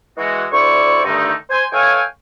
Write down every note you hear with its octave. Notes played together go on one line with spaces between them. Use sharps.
E3 G#3 F#4
D2 E4 C5 D5 C#6
G2 D3 D#3 A3 D#4
C5 G#5
E3 A4 C#5 F5 G5 G#5